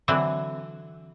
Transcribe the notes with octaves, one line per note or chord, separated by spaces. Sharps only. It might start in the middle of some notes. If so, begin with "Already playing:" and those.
D3 E3 F#3 C4